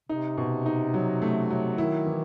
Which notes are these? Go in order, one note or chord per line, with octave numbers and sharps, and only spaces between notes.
C3 D#4
B2
D#4
F#3
A3
F#3
D#3 E4
E3